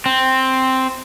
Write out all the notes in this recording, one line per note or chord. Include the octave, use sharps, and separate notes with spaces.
C4